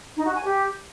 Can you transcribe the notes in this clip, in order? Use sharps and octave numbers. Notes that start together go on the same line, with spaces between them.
D#4
F#4
G#5
G4